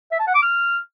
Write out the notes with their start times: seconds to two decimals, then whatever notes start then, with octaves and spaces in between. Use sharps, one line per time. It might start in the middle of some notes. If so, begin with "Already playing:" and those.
0.12 E5
0.19 A5
0.27 F#5
0.35 D6
0.42 F6